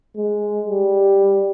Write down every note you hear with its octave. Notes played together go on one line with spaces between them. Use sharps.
G#3
G3